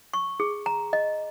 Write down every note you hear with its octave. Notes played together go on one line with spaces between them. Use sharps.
C#6
G#4
A#5
D#5